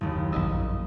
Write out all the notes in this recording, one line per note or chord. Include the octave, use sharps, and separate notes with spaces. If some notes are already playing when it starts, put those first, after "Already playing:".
F#1 D#2
A#1 E2 G2 D#5 E6